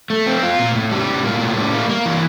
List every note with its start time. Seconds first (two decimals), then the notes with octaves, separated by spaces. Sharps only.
0.10 A3
0.26 C4
0.43 F4
0.59 A#2
0.75 A2
0.91 G3
1.08 A2
1.24 A#3
1.41 A2
1.57 G3
1.73 A#3
1.89 A#3
2.05 E3